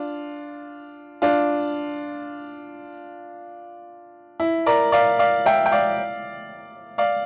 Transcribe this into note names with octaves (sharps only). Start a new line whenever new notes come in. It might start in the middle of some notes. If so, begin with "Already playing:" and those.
Already playing: D4 F4
D4 F4
E4
A#4 D5
D5 F5
D5 F5
E5 G5
G5
D5 F5
D5 F5